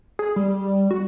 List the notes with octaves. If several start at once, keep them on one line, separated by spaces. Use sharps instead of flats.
G#4
G3
F#4